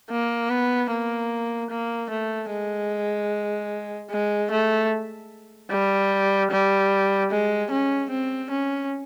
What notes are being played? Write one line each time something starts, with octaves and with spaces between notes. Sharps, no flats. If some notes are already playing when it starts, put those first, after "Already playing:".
A#3
B3
A#3
A#3
A3
G#3
G#3
A3
G3
G3
G#3
C#4
C4
C#4